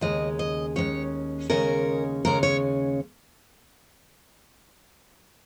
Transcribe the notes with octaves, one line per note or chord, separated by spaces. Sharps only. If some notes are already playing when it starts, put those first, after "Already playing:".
D#2 C#3 G#3 C#4 D#5
D#5
D#2 C#3 G#3 C#4 C#5
D#2 C#3 G#3 C#4 A#4
D#2 C#3 G#3 C#4 A#4
C#5